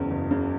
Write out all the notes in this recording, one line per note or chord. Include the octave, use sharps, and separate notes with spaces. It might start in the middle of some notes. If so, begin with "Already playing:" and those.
Already playing: F#1 E2 C#3
F#1
C#3